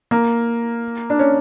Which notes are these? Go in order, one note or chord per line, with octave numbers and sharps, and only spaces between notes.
A#3
D4
C#4